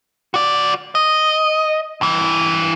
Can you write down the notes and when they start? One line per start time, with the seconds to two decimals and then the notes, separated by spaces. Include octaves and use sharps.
0.34 F#4 D5
0.95 D#5
2.01 G2 E3